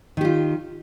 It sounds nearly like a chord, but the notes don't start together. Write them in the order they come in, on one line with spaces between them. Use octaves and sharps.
D#3 G4 F4